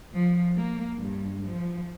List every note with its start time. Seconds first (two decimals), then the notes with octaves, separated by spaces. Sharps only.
0.14 F3
0.55 A#3
0.96 G2
1.46 F3